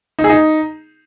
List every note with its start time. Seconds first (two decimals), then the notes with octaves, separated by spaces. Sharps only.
0.19 D#4
0.24 G#4
0.29 D#4